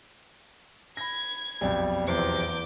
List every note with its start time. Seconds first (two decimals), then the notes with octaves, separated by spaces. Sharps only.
0.97 B5 G#6 A#6
1.61 B1 F2 G3
2.07 E2 C3 D6 G6